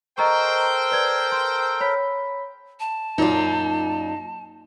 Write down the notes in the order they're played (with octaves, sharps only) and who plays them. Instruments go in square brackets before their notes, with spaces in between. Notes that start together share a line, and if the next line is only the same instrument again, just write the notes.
[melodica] A4 A#4 [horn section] C5 G5 [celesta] D#5 A#5 C#6
[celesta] B4 D5 G#6
C6
C#5 B5 B6
[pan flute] A5
[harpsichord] F#2 A#2 [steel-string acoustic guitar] D#4 F4